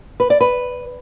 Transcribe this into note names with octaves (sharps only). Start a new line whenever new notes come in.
B4
D5
B4